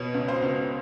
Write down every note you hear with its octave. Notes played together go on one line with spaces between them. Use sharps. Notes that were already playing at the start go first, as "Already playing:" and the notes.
Already playing: B2 C#5
C#2
C5
C#2